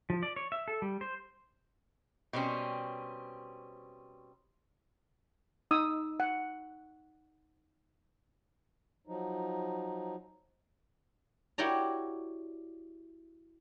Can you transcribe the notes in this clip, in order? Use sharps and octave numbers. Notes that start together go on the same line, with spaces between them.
F3
D5
C#5
E5
A4
G3
C5
B2 G3 C4 C#4
D#4 D#6 E6
F#5
F3 F#3 D#4
E4 F#4 G4 C#5 D5 A#5